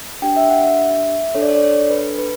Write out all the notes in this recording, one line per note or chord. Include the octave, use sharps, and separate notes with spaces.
D4 G4 G5
E5
F#5
E5
D4 A4 C#5
D5
C#5
D5
C#5
B4
B4